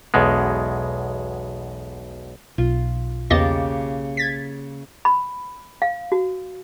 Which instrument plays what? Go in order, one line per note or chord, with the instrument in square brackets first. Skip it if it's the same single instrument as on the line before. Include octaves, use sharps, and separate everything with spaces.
[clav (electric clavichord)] B1 E2 B2 G#3
[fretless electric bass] B1 [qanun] F4
[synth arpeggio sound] E2 D#5 A6 [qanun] C#3 A#3 G4
[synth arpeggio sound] G#6 A6 B6
[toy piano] B5
F5
F#4